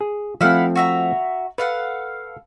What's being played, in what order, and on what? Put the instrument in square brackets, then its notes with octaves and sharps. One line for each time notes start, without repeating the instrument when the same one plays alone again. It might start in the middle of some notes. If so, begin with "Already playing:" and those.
[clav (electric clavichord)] G#4
[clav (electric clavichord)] F3 A3 C4 [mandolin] E4 F5 F#5
[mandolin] F#4 E5 A#5
[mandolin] A4 F5 F#5 [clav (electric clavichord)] B4